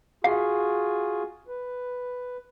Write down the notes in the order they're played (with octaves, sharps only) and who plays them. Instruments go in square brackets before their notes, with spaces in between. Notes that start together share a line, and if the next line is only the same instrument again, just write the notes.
[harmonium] F4 F#4 G#4 [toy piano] F#5
[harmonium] B4